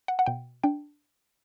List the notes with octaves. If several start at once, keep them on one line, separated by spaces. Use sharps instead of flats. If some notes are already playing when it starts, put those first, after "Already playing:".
F#5
F#5
B2 G5
D4 G5